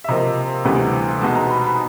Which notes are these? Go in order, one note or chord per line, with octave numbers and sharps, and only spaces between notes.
E5
C3 F3 A#3 D#5
D2 C3 E3 G3 B3
B2 G#3 B3 D#4 A5
A#5
B5
B5